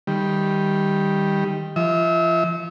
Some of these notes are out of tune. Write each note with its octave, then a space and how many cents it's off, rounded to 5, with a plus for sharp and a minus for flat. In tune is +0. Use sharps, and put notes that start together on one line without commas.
D#3 +0 G3 +0
F3 -30 E5 -35